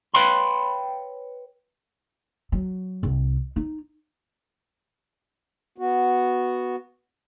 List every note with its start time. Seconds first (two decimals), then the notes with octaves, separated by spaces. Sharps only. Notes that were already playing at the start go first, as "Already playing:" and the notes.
0.14 B4 C#5 F5 G5 B5 C6
2.52 F#3
3.03 C2
3.56 D#4
5.78 B3 F#4